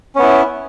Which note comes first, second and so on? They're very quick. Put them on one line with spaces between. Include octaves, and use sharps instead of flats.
C#4 B3 E4